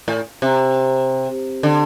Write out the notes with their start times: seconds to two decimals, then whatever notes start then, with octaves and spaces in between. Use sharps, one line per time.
0.08 A2
0.42 C3
1.63 D3